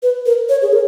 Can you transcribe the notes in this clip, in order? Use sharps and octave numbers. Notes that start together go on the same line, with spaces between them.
B4
A#4
C#5
G#4
A#4